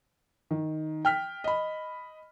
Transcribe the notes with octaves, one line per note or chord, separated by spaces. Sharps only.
D#3
G5 F6 B6
D#5 B5